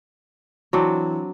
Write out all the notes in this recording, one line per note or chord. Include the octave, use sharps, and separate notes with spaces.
E3 F#3 C4 D4